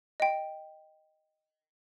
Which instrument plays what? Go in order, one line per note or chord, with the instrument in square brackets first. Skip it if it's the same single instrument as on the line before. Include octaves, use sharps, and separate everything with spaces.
[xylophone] D#5 G5